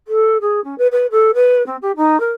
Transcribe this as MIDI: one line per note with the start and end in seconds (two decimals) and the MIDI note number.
0.07 0.37 69
0.41 0.62 68
0.64 0.75 61
0.78 0.87 71
0.92 1.06 71
1.11 1.31 69
1.34 1.64 71
1.66 1.76 60
1.82 1.92 67
1.96 2.19 63
2.20 2.31 70